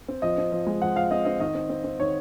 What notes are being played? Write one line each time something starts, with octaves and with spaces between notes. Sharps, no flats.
C4
F3 D#5
C4
F3
G#3
F3 F#5
F3 F5
C4 D#5
C4 D#5
D#3 D#5
C4
C4
C4
D#3 C#5